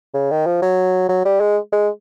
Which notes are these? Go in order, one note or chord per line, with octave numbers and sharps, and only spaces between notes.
C#3
D#3
F3
F#3
F#3
G3
G#3
G#3